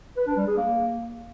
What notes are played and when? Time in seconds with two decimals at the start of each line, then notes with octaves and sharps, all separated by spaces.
0.17 B4
0.27 D4
0.37 G3
0.47 G#4
0.57 A#3